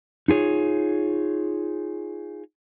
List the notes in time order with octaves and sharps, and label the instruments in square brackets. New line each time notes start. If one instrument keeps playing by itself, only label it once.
[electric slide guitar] D#4 F4 G#4 C#5